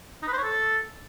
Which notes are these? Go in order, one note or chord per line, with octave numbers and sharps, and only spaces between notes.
D#4
B4
C5
C#5
A4